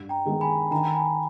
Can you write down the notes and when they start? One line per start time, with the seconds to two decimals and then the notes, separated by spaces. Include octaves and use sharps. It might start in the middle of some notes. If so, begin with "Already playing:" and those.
Already playing: G2
0.09 G5 A#5
0.25 D#3 G#3 B3
0.41 G#5 B5
0.71 D#3 G5 A#5
0.83 A#5
0.94 G#5 B5